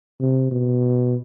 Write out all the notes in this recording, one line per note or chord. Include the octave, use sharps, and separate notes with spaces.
C3
B2